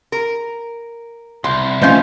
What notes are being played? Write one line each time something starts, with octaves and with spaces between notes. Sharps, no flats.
A#4
C2 C6
F3 A3 C#4 D#4 F4 C5 G6